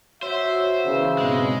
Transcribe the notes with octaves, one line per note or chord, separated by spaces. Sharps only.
F#4 C5 C#5 E5
C#3 E3 B3
G#2 B2 G#3 C4